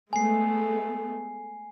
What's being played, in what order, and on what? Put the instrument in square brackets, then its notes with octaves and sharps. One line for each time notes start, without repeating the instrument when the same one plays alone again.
[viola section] G#3 A3 B3 [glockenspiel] G#5 C7